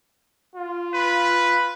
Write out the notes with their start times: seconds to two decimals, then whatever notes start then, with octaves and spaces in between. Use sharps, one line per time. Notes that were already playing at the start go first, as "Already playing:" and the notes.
0.55 F4
0.94 B4